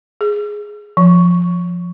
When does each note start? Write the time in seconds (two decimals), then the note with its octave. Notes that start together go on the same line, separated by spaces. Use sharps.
0.21 G#4
0.97 F3